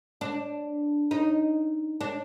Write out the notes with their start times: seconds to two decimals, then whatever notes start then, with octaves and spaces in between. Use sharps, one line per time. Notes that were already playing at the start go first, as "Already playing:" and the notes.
0.21 D4
1.11 D#4
2.01 D4